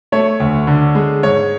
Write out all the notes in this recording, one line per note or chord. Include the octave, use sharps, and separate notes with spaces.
A3 C#5
D2
D3
G#3
G#2 C#5